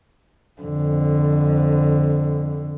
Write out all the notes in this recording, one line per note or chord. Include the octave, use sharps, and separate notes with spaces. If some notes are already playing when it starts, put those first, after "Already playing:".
F2 D3